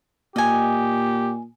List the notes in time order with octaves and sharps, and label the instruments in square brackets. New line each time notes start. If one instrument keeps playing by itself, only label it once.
[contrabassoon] A#2 [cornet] G4 [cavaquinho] D#5 G#5